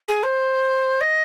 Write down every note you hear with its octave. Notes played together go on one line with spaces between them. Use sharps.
G#4
C5
D#5